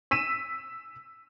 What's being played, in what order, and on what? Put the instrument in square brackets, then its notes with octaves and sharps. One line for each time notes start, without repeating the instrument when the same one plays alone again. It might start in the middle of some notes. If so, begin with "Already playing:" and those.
[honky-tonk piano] E6 B6 D#7 E7